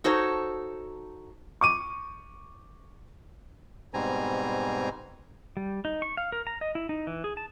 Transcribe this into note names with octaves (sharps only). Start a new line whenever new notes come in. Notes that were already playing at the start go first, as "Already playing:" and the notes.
D#4 F#4 A4 C5 C#5
C#6 D6 D#7
G#2 B2 G3 C4 G#5 A#5
G3
D#4
C#6
F5
A#4
A#5
D#5
E4
D#4
E3
G#4
A5